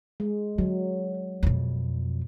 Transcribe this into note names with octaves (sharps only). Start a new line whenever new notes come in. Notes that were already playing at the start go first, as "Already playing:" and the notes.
G#3
D3 F#3
F2 B2